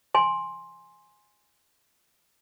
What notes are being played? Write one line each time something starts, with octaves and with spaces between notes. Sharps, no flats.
G#5 C6